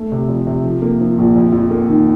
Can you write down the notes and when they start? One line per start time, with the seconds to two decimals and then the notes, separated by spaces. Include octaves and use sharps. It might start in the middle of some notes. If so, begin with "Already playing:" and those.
Already playing: A3
0.12 C3
0.28 F2
0.47 C3
0.64 F3
0.82 A#3
1.00 F3
1.18 A#1
1.36 F2
1.53 F2
1.71 A#3
1.89 D#3